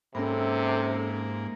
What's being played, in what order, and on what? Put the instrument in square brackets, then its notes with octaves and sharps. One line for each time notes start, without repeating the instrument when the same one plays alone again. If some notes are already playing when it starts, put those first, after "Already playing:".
[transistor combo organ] G#2 A#3 [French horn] C3 [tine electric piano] C#4 B5 [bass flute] A4